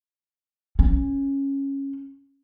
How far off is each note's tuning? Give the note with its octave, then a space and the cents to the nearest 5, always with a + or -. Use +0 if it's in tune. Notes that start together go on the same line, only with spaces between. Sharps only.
C#4 -10